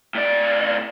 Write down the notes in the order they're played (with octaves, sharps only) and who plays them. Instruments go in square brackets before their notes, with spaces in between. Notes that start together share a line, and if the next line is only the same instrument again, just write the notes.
[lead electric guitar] A2 D5